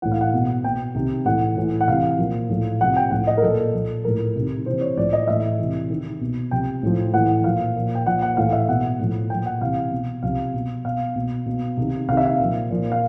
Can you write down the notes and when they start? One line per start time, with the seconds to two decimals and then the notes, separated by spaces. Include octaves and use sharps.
0.02 A2 E3 F#5
0.12 F5
0.21 F#5
0.33 B2
0.64 B2 G5
0.94 C3 D#3
1.25 A2 E3 F#5
1.57 A2 E3
1.81 F#5
1.88 C3 E3 F5
2.18 A#2 F3
2.50 A2 F3
2.80 C3 F3 F#5
2.97 G5
3.11 A2 F3 F#5
3.27 D#5
3.37 A#4
3.42 A#2 F3 A4
3.73 A#2 F3
4.04 A2 F3 A#4
4.36 C3 D#3
4.66 C3 E3 C5
4.81 C#5
4.97 A2 F3 D5
5.13 D#5
5.28 A2 E3 E5
5.59 C3 E3
5.90 C3 D#3
6.21 B2
6.51 C3 F3 G5
6.83 A2 F3
7.14 A2 E3 F#5
7.44 A#2 F3 F5
7.75 A#2 F3
7.95 G5
8.06 A#2 F3 F#5
8.22 F#5
8.37 A2 E3 F5
8.53 E5
8.68 B2 F#5
9.00 A2 F3
9.30 A#2 F3 G5
9.46 F#5
9.61 C3 E3 F5
9.92 B2
10.23 C3 F3 F5
10.54 B2
10.85 B2 F5
11.16 B2
11.46 B2
11.77 C3 D#3
12.09 C3 F5
12.12 D#3
12.17 E5
12.25 F5
12.39 A#2 F3
12.70 A#2 F3
12.92 F5